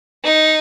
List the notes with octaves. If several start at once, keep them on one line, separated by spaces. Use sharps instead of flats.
D#4